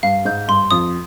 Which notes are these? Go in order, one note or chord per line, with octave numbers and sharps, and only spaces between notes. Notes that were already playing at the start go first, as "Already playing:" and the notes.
G2 F5
G#2 G6
G2 C6
F2 D#6